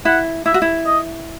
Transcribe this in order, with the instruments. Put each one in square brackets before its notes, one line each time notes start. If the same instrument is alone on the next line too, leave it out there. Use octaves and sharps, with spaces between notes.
[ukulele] E4 [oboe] F#5
[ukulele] E4 [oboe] E5
[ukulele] F#4
E4
[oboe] D#5